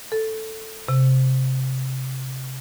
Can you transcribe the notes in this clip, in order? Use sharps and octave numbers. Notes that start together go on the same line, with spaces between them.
A4
C3